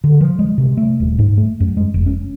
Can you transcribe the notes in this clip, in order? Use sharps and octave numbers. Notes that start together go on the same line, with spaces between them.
D3
F3
G#3
C3
A3
D#1
G#2
A3
F#2
G#3
F1
C#4